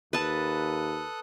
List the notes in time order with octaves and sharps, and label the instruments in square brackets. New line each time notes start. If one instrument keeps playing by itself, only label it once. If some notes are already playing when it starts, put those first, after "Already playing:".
[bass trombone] D#2 [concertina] A4 D#6 F#6 [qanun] B4 A5